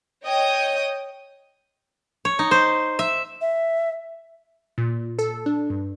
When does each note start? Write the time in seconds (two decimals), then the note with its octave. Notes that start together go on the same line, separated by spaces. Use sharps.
0.24 C#5 D#5 G5 D#6
2.25 C#5
2.39 D#4
2.51 C5
2.99 E5
3.41 E5
4.78 A#2
5.19 A4
5.46 D4
5.70 G2